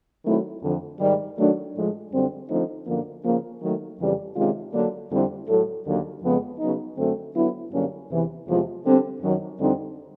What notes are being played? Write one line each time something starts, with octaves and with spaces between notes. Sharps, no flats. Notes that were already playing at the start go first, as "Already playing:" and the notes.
D#3 F#3 A3 C4 E4
F2 D3 F3
G#2 D#3 G3
D#3 F#3 A3 D4
A2 F3 G#3
F#2 D3 G3 C4
D3 F3 A3 C4 D#4
F#2 D3 F3 A#3
C#3 F3 A#3
D#3 F#3 A3
F2 C#3 E3 G3
C3 D#3 G#3 C#4 F4
D3 F#3 A#3 D4
F2 D3 G3 C4 E4
A2 F#3 A3
D#2 D3 F#3 A#3
F2 C#3 F3 G#3 B3
C#3 F#3 B3 D#4
F#2 D3 F#3 A3 C4
D3 F#3 B3 E4
G2 D3 F#3 A#3 C#4
E2 C3 E3
E2 C3 F3 G#3
D3 G3 C4
F#2 D#3 F#3
F2 D3 G3 C4 D#4